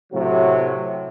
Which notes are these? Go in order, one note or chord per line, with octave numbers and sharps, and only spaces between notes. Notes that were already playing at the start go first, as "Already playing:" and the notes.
A2 C3 F#3